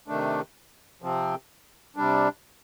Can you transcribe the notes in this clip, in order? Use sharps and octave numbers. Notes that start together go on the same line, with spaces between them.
C3 D#3 A3 D4
C3 F3 C4
C3 G3 D4